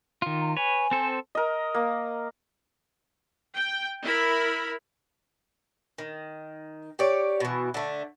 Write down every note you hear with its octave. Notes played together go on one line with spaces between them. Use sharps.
D#3 F4
A#5
B4 C#5 G#5
C4 A4 C5
A#4 D#5
A#3
G5
E4 A#4 B5
D#3
G4 C#5 D5
B2 E3
D3 A3